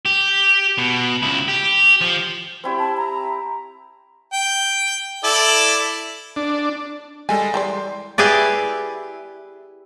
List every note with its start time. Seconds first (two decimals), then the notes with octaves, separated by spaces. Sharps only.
0.05 G4
0.78 B2
1.22 C#2 E4
1.48 G4
2.01 F3
2.64 C4 E4 G4
2.79 A5
2.97 A#5
4.33 G5
5.24 E4 A4 D5
6.36 D4
7.29 G3 G#3 A4 G#5
7.54 E3 A4 D5 G5 C6
8.18 E4 G4 G#4 B4 D5